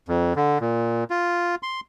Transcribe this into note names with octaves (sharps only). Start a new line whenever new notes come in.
F2
D3
A#2
F4
C6